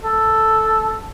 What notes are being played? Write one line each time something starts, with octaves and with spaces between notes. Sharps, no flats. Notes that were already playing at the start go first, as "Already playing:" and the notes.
A4